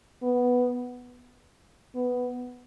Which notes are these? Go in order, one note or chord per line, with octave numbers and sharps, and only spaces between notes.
B3
B3